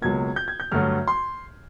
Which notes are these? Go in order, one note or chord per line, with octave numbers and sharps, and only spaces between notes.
C#2 B2 F#3 A#3 G#6
G6
G#6
G6
G2 D3 F#3 A3 F6
C6